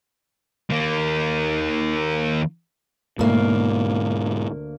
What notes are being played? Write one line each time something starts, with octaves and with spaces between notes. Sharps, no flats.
D#3 A#3
D2 G#2 B2 A#3